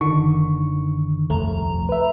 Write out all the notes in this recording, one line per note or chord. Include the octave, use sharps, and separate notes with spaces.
F#1 D3 D#3 C#6
D#1 C2 F2 A3 A#5
B4 E5